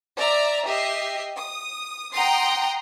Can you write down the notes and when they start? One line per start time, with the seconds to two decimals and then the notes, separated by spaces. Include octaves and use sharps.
0.17 D5 E5 A#5
0.65 G4 D#5 E5 C7
1.37 D#6
2.14 F#5 G5 A#5 C6 D#6